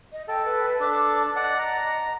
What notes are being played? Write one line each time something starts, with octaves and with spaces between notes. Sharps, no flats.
D#5
A4 G5
B4
D4 A4 D6
D5 D#5 F#5
A#5